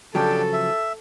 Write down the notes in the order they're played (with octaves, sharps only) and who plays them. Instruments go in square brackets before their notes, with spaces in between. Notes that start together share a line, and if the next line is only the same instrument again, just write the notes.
[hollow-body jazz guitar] C#3 F3 F#3 [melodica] D4 G4 G5 [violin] A4
[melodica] E5